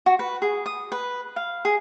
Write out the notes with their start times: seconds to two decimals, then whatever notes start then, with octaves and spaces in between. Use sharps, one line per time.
0.06 F#4
0.19 B4
0.42 G#4
0.66 D#6
0.92 B4
1.36 F5
1.65 G#4